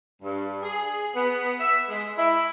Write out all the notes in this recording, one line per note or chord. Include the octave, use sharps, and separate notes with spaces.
G2
G#4
B3
E5
G#3
E4